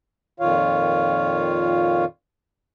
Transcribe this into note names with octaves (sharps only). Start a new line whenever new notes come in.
F2 A#2 D#3 F4 C#5 F5